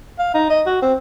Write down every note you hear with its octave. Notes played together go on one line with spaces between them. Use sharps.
F5
D#4
D#5
F#4
C4